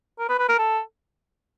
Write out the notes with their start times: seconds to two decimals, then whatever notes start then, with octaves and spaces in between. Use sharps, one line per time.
0.19 A#4
0.29 B4
0.39 B4
0.49 A#4
0.59 A4